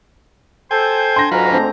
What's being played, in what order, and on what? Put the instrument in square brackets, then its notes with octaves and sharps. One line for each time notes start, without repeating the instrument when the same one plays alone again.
[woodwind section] A4 C5 [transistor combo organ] G5 G#5
[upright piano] C6 A#6
[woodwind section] D2 G#2 A#5 [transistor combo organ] F#3 F4 B4
[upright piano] A3 C4 D4